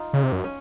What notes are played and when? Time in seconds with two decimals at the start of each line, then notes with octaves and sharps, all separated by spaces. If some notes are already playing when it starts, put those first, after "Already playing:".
Already playing: D#4 F4
0.13 C#3
0.23 C3
0.32 F#2
0.44 C#4